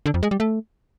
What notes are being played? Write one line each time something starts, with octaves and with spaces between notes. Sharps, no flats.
D3
F2
G#3
G3
A3